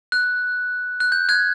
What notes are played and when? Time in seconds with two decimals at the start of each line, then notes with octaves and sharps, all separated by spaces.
0.12 F#6
1.00 F#6
1.12 G6
1.29 F#6 G#6